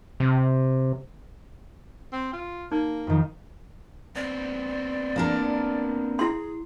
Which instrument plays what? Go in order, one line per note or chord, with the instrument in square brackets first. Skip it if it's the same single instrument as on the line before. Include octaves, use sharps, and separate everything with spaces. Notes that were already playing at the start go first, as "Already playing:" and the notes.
[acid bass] C3
[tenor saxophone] C4
F4
[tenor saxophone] A#3 [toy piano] D#4
[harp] F2 D#3
[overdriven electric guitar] B3 C4 [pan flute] D5
[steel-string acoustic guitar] A#3 D4 A#4
[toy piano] E4 C6 [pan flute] G#4